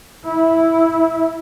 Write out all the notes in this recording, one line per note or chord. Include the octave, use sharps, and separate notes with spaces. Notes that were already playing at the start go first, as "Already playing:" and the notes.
E4